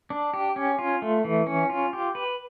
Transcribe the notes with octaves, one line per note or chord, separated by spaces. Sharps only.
D4
G4
C#4
F4
A3
E3
C#4
F4
G4
B4